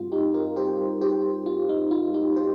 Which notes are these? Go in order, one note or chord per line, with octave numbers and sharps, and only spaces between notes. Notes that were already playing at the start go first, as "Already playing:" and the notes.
Already playing: G2 G3 C4 F4
D#4 G4
F4 A#4
G4 C5
G4 C5
F4
D#4
F4
D#4 G4
G4 C5